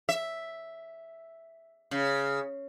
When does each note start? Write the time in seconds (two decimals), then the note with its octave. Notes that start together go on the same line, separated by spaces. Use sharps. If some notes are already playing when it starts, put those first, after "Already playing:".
0.09 E5
1.91 C#3